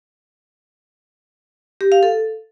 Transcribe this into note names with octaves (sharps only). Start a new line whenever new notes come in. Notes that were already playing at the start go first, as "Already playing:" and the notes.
G4
F5
A4